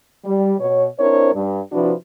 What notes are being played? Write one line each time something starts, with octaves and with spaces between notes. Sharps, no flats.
G3
B2 C#5
C4 D4 E4 A#4 C5 C#5
G2
C3 F3 D4 E4 F#4 B4